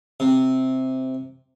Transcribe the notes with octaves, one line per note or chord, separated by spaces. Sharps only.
C3